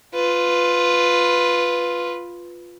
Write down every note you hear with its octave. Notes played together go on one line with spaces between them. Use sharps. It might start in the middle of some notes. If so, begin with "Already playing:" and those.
F4 B4